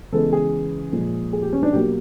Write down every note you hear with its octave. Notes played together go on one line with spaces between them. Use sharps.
C#3 E3 G#3 B3 A4
G#4
A#2 F3 G#3
G#4
G4
C#4
D4
B2 F#3 A#3 G4